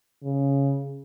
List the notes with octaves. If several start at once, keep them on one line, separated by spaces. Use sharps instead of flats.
C#3